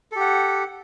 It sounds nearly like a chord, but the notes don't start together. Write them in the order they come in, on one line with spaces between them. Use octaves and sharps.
A4 G4 F#5